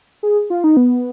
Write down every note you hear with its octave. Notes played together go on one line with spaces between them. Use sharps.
G#4
F4
D#4
B3